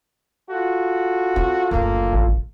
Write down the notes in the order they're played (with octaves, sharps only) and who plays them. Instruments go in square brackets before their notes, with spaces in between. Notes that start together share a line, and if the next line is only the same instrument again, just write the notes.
[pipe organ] F4 A4 [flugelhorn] F#4
[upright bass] C4
[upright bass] F#1 D2 [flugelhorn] A#3
[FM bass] A1